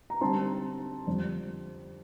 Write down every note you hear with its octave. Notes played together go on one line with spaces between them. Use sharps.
A#5
D3 G3 C4 D#4 A5 C6
F2 D3 G3 D4